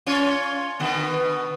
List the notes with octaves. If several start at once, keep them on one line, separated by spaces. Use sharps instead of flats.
C#4 F4 C#5
B2 D3 B3